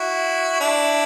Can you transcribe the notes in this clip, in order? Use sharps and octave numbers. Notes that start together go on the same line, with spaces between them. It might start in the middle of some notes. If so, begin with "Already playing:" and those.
Already playing: E4 F#4
D4 E4